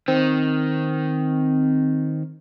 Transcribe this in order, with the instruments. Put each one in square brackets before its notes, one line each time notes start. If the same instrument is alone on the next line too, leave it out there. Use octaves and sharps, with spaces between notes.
[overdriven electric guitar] D#3 [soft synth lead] C4